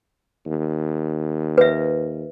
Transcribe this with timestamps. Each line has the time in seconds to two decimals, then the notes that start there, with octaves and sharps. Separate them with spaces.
0.46 D#2
1.58 B4 E5